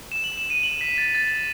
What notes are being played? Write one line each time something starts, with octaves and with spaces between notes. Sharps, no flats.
E7
F#7
E7
D#7
F#7
B6
A6
A6